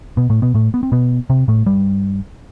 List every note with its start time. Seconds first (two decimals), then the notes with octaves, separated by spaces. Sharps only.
0.17 B2 B3
0.30 A2 A3
0.42 B2 B3
0.54 A2 A3
0.74 B3
0.83 C4
0.92 B2 B3
1.30 C3 C4
1.48 A2 A3
1.66 G2 G3